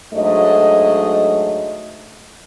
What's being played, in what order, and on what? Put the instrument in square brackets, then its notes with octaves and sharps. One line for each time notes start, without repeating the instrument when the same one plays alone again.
[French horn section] G#2 F#3 A3 D4 D#5